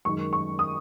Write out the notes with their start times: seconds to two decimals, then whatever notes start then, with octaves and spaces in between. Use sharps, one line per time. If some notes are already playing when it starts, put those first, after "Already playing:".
0.05 F#2 D#3 G#3 C#6
0.33 C#6
0.59 D#6